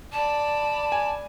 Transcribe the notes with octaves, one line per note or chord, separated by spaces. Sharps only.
D5 A5 B5
G#5